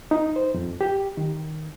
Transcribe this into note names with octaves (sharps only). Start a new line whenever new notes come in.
D#4
C5
F2
G4
D#3